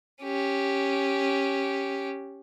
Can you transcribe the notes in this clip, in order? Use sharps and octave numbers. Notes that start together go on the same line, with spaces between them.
C#4 G4